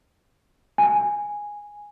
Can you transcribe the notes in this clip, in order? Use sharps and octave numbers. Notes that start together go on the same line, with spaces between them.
G#5